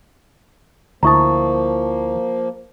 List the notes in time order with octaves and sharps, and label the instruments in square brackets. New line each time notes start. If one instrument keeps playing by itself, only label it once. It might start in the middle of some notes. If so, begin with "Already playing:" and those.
[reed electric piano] D2 E4 A5 [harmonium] F3 A#3 [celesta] A#5 C#6 D#6